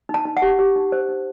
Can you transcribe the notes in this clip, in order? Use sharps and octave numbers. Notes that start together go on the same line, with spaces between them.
D#4
A5
D#4
F#5
G4
G4
D#4
C5
D#4